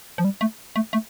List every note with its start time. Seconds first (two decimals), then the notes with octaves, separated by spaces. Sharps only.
0.18 F3
0.24 G3
0.41 A3
0.76 A3
0.93 A3